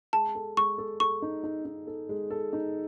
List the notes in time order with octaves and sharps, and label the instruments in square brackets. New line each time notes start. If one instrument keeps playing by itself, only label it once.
[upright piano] G#3 [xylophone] A5
[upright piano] A4
[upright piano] G#3 [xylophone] C#6
[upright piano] A4
[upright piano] A4 [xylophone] C#6
[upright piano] D#4
D#4
D#4
A4
G#3
A4
D#4